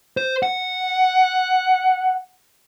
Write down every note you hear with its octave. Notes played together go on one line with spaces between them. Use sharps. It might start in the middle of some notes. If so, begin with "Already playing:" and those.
C5
F#5